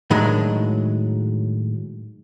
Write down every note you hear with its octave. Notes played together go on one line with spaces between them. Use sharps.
A2 D#3 F#3 G#3 D4